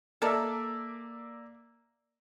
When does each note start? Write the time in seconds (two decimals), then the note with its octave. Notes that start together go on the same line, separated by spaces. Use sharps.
0.22 A#3 A4 A#4 D5 E5